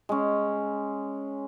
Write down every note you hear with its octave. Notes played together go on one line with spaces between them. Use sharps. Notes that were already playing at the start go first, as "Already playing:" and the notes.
G#3 C#4